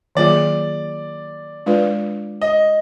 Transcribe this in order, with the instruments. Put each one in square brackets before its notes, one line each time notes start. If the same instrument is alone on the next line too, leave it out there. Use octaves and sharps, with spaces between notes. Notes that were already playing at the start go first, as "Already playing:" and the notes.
[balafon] D#3 F#3 A#3 F4 G#4 [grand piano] D5
[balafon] G#3 D4 F4 B4 D5
[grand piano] D#5